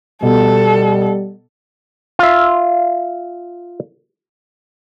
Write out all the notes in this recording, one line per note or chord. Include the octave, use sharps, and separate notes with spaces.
B2 G3 A4
F4 E5